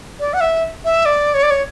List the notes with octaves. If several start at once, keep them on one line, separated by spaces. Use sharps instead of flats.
D5
F#5
E5
E5
D5
C#5
D5
C#5